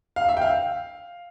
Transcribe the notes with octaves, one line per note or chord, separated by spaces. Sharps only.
F5
E5
G5
F5